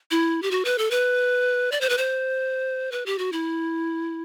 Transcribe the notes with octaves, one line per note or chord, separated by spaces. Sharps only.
E4
G4
F#4
B4
A4
B4
D5
C5
B4
C5
B4
G4
F#4
E4